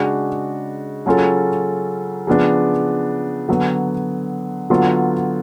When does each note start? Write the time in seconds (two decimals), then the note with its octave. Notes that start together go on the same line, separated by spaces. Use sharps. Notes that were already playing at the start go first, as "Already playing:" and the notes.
Already playing: C#3 G#3 D4 F#4
1.06 C#3 F#3 C#4 F4 A4
2.27 C#3 F3 B3 D4
3.48 D3 F#3 B3
4.70 D3 F#3 B3 F4